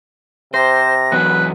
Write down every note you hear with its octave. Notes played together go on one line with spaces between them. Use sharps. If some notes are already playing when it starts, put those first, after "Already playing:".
C3 C5 A#6
E2 F#3 B3 B4